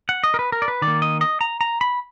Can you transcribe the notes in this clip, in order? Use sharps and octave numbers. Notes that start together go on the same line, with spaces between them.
F#5
D#5
A#4
B4
A#4
D5
B4
D#3 D5
A#3
D#5
D#5
A#5
A#5
B5